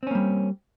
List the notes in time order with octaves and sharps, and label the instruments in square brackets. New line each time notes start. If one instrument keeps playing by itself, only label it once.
[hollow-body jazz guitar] C4
C#4
A#3
G3